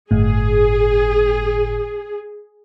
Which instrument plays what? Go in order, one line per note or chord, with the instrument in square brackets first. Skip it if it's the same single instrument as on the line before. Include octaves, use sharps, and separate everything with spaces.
[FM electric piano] G1 A2 [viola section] G#4